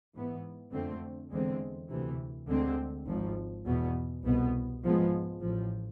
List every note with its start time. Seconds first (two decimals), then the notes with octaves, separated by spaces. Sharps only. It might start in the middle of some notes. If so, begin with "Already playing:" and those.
0.14 G#2 E3 B3
0.72 F2 D3 A3 C4
1.31 E2 D3 G#3 C4
1.89 D2 C3 E3
2.48 D2 D3 G#3 C4
3.07 G#1 G#2 F3
3.66 E2 B2 B3
4.24 C2 B2 B3
4.83 G#2 F3 G#3 B3
5.41 A1 A2 F3